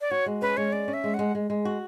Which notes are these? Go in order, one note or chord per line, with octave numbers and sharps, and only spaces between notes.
D5
F#4 C#5
G#3
C#4 B4
G#3 C#5
C#4 D5
C#4
E5
G#3
G#3 F#5
G#3
G#3
F#4